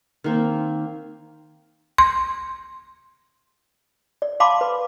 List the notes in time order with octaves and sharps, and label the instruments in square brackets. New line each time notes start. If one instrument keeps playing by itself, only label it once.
[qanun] D#3 A#3 C4
[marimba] C6
[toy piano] D5
F5 A5 B5 C6 D6
B4